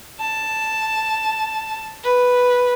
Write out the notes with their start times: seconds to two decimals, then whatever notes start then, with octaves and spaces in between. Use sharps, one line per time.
0.20 A5
2.04 B4